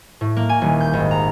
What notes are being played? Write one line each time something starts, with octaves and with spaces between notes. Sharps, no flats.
A2
A#3
G#5
D#1
G6
G#1
A#5